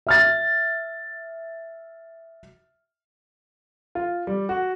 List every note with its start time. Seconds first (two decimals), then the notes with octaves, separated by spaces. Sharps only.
0.07 E5 F6 A6
3.95 F4
4.27 G3
4.49 F#4